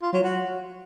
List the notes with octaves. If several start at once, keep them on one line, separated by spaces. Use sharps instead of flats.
F4
F#3
F#4